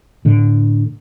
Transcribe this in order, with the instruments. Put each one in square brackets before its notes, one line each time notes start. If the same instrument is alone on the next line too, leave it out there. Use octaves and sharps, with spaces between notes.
[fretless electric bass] A2 D3